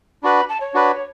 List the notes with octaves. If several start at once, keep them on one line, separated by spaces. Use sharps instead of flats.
D4 F#4 B4 B5
B5
A5
C#5
D4 F#4 B4